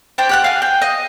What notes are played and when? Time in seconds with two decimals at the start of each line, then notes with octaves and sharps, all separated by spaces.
0.18 D4 G4 C5 G5
0.29 G4 F#5 F#6
0.44 F5 G#5
0.62 G5
0.82 D#5